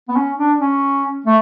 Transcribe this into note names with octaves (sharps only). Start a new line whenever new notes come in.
B3
C#4
D4
C#4
A3